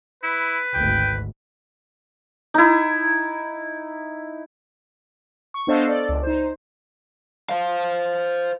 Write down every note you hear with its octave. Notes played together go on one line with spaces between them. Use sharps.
E4 B4
G#1 D2 G5
D#4 E4
C#6
B3 D4 A4 C5 D#5 F5
A4 D5
C#2
D#4 C5
C5 F5